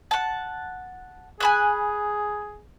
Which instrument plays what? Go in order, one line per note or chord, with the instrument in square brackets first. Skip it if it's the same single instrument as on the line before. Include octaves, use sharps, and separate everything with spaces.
[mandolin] F#5 A5
[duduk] G#4 [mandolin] G#5 B5 F#6